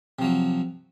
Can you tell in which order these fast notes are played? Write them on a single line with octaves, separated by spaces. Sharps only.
C3 F3 F#3